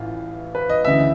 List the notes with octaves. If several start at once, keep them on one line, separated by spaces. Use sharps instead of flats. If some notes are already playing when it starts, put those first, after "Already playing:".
Already playing: A1 A2 E3 F4
B4
D#5
D2 C#3 E3 E5